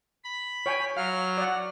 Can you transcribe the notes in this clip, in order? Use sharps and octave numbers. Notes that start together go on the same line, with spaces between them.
B5
C#5 G5 G#5
F#3 F5 F6
D5 F#5